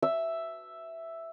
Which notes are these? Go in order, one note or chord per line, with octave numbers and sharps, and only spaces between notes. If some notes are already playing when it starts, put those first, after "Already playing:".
E5